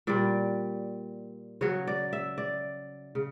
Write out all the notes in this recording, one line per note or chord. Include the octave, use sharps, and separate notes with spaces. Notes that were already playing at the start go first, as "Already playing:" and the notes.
A#2 G3 D5
C#3 F#3 C#5
D5
E5
D5
C#3